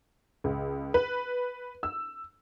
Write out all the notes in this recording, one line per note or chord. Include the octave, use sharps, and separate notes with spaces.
C#2
B4
E6